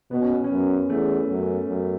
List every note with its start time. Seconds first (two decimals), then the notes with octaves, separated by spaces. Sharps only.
0.11 B2 B3
0.22 C#4
0.33 B3
0.44 C#4
0.50 F#2 B3
0.90 E2 A3
1.29 F#2
1.68 F#2